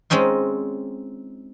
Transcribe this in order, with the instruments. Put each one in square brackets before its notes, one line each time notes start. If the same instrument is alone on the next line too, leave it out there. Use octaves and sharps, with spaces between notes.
[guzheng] G#3 C4 C#4 D#4 F4